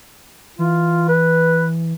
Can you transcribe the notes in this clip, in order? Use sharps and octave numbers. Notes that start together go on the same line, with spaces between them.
E3 F4
B4